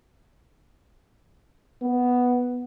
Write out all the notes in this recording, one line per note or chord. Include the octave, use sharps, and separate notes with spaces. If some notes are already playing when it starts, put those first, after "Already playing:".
B3